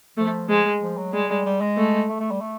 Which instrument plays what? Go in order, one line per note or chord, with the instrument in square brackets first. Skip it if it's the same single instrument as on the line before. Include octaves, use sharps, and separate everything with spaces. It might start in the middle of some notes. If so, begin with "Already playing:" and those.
[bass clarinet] F3 [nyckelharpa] A3
[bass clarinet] F3 [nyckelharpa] G#3
[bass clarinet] F3
F#3
[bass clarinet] G3 [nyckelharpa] G#3
[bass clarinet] G3
G3
G#3
[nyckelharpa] A3
[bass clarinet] A3
A3
G3
A3